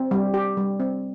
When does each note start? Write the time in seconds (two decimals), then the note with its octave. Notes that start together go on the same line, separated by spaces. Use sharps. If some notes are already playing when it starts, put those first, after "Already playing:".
Already playing: C4
0.11 G3
0.34 G4
0.57 G3
0.80 C4